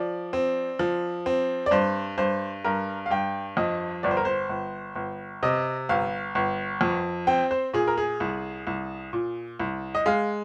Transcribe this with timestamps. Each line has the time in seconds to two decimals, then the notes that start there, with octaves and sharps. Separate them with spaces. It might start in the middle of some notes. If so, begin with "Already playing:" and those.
Already playing: F3 D5
0.33 C4
0.79 F3
1.26 C4
1.66 D5
1.71 G2 C5
2.18 G2 C5
2.64 G2 A#4
3.06 F5
3.11 G2 G5
3.57 F2 D#5
4.03 G1 D5
4.11 C5
4.17 A#4
4.25 C5
4.49 G1
4.95 G1
5.43 C3 D#5
5.89 G1 F5
6.35 G1
6.81 F2
7.27 C4 G5
7.51 C5
7.74 A#2 G#4
7.88 A#4
7.98 G#4
8.20 C2
8.67 C2
9.13 A#2
9.60 C2
9.95 D#5
10.06 G#3 F5